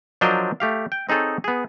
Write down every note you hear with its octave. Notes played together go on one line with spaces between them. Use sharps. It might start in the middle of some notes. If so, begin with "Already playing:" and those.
F3 F#3 D4 A#4 C5 D#5
A3 G4 F5
G5
C4 D#4 G#4 A4 C#5
B3 G#4